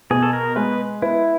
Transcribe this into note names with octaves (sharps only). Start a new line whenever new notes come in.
B2 G#4
A4
A#4
G#3 B4
B3 E4